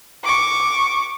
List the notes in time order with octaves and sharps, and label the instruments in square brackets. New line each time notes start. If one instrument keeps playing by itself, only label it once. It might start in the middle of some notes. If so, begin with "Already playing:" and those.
[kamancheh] C#6 D6